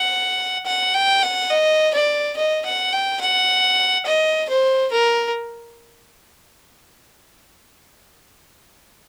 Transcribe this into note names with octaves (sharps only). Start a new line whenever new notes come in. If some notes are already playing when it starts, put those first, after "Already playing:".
Already playing: F#5
F#5
G5
F#5
D#5
D5
D#5
F#5
G5
F#5
D#5
C5
A#4